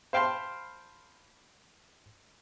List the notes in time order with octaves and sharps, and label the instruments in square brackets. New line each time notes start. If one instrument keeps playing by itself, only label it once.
[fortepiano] C5 F5 G5 A5 B5 C6